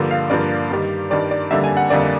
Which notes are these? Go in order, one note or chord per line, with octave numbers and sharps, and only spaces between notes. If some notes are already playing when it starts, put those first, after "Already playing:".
Already playing: G2 D3 F3 A#3
F5
G2 D3 F3 A#3 D5
G2 D#3 G3
G2 D#3 G3 D5
D5
F2 D3 G3 A#3 E5
G#5
F#5
F2 D3 G3 A#3 D5